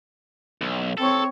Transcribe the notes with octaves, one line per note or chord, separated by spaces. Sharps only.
B1
C4 A4 C#5